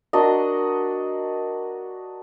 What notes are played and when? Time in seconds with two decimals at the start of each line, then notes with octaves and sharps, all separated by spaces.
0.13 D4 F#4 A#4 D#5